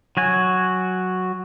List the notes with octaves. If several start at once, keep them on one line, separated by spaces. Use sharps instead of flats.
F#3 F#4 G#5